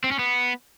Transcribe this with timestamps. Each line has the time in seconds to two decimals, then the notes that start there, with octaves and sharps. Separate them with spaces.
0.04 C4
0.12 C#4
0.19 B3